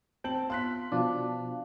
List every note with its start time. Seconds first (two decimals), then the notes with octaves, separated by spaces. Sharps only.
0.24 C4 G5 A5 F#7
0.50 B3 F4 C6 F#6 B6
0.92 B2 F3 D4 F5